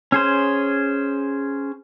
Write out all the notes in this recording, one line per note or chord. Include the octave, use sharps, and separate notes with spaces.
C#4 G#4 C5